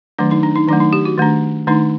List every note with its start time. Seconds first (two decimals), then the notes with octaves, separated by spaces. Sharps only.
0.18 D#3 F#3 A3 D4
0.31 D#4
0.43 D4
0.55 D#4
0.68 D#3 F#3 A3 D4
0.80 D#4
0.93 G4
1.05 F#4
1.18 D#3 A3 D4
1.67 D#3 A3 D4 D#4